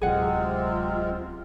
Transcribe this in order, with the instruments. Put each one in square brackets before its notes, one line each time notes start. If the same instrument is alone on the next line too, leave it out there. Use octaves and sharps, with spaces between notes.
[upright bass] D1 F#3 [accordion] C3 G#3 C4 [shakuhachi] F4 [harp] G#4 F#5